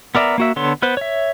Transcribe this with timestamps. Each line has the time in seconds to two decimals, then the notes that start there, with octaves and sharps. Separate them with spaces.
0.15 B3 A#4 D5 E5 A#5
0.38 A#3 F#4 E5
0.56 D3 B3 A4 C#5 C6
0.82 B3 B4 C5
0.97 C#5 E5